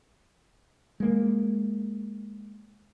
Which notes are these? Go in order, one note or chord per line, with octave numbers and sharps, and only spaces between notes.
G#3 A#3